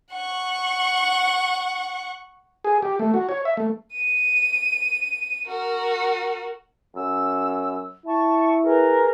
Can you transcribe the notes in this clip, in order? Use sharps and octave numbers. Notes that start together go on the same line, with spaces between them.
F#5 C#6
G#4
G4
A3
F#4
C#5
E5
A3
D#7
F#4 A#4
F#2 E6
E4 A5 C#6
G#4 A#4 B4